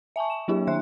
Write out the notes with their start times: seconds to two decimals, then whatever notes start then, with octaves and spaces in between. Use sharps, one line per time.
0.16 E5 G#5 A5 C#6
0.30 E7
0.48 F#3 A#3 D4 E4 G4
0.67 D#3 E5 C6 F#6